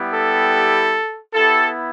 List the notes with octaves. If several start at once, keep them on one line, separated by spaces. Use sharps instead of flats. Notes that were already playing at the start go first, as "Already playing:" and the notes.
Already playing: G3 B3 E4 G4
A4
B3 E4 G4 A4